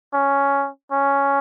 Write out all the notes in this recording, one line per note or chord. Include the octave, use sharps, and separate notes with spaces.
C#4
C#4